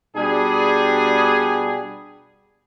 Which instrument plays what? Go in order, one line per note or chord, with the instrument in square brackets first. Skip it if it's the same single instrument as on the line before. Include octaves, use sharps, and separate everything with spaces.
[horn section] B2 G3 D4 G#4